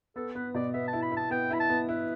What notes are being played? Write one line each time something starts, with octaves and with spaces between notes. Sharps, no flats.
B3 A4
B3 B4
B2 D5
B3 E5
A5
E4
B5
E4 A5
B3 G5
E4 B5
A5
B3
E4 B4